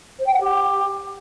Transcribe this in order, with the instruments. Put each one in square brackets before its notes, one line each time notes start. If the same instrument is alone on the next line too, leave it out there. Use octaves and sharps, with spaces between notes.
[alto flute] C5
G5
F#5
G4